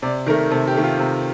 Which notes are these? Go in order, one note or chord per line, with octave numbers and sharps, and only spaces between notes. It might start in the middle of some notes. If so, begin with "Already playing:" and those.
C3 D5
D#3 A3 A#4
C3 A4
G4
D#3 A3
F4
C3